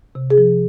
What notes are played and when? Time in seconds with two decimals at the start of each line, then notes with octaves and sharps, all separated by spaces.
0.15 C3
0.30 G#4
0.38 F3